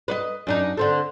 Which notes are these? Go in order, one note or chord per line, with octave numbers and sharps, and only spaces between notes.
B4 D5 D#5
F#2 D4 D#4
D3 C4 A4